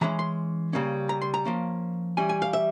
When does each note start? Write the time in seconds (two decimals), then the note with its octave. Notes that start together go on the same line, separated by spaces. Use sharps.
0.01 E3 G#3 C#4 A#5
0.19 C6
0.73 C#3 G3 A#3 C#4
1.09 A#5
1.22 C6
1.34 A#5
1.45 F3 A#3 C#4
2.17 E3 G3 C#4 G#5
2.29 G#5
2.42 F5
2.53 E5